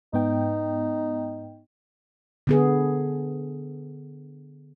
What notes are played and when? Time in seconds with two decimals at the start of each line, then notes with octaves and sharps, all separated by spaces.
0.14 G#2 B3 D#4 G5
2.47 D3 B3 G#4